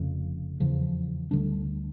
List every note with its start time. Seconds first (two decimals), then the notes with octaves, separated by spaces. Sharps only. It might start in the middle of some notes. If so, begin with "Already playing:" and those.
Already playing: F1 F2 C#3
0.60 E2 C#3 F3
1.31 D2 D3 G3 D4